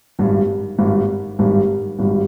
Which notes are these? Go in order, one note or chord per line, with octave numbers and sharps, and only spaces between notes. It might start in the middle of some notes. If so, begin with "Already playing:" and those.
G#1 G2 G3
G#1 G2 G3
G#1 G2 G3
G#1 G2 G3